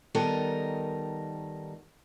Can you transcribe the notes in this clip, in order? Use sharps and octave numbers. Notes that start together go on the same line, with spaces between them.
D#3 G3 B3 D#4 A4 A#4